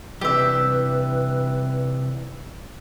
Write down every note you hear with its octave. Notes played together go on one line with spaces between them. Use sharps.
C3 E3 G3 G4 B4 E5